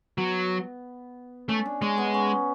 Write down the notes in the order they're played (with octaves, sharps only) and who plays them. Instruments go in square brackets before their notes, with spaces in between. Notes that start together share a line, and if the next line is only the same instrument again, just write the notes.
[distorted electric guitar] F#3 [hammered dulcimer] B3
[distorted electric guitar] A3 [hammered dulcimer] C#4
[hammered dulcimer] D4
[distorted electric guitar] G#3 [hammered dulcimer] C#4
[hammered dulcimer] B3
C#4